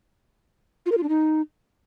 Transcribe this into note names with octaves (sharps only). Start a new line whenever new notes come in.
F4
A#4
F4
D4
D#4